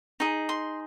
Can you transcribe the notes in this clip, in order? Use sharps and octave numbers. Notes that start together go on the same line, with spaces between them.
D#4 G#4
C6